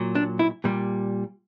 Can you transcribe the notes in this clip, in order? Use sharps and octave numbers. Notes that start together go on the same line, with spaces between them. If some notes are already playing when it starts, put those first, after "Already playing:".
Already playing: A#2 F#3
D4
E4
A#2 G3